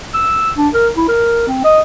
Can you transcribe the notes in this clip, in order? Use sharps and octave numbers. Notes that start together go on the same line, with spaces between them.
E6
D4
A#4
E4
A#4
C4
D#5